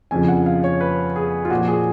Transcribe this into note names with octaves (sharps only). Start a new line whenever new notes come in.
F2 C#3 F3 G#5
F#5
F5
C#5
B4
G#4
F4
A#2 F3 F#4
G#4